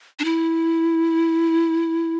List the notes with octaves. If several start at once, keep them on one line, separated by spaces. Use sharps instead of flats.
D4
E4